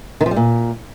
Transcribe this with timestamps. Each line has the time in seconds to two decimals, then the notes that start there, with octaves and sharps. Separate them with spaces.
0.21 D#3
0.26 F3
0.31 G3
0.36 A#2